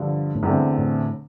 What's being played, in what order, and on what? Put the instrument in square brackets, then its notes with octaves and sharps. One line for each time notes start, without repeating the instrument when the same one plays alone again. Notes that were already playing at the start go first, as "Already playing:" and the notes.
Already playing: [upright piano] G2 D3 F3
[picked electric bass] A2
[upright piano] E2 D3 A3 C4 [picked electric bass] G2
[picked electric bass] A2